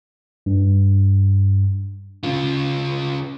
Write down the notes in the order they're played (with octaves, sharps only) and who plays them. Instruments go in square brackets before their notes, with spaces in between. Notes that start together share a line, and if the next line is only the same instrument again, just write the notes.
[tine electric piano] G2
[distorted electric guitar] C#3 F4